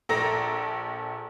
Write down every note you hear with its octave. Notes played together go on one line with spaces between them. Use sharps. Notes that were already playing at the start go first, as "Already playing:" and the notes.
A#1 A4 A5 A#5 A#6